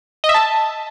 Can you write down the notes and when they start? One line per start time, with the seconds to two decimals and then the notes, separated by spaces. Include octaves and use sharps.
0.24 D#5
0.29 E5
0.34 A5